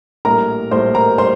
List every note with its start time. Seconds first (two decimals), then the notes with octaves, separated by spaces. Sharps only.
0.25 A#1 A2 G3 A#4 A#5
0.71 A#1 A2 G3 C5 C6
0.94 A#4 A#5
1.18 G3 C5 C6